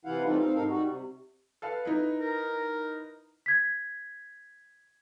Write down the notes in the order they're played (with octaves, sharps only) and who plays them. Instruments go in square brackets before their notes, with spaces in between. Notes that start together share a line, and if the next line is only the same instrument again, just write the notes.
[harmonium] C3 E3 E4 F4 F5 F#5
E3 G3 A3 C4 D#4 F4
C4 D#4 F5
G#2 C3 D#4 A4 A#4 F5
G3 D#4 F#4
C3
[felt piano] A4 B4 F5
D#4 E4 B4
[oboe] A#4
[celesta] G#6 B6